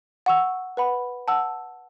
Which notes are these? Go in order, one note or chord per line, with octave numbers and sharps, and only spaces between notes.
F#5 C#6 E6
B4 F#5 B5
F#5 A5 E6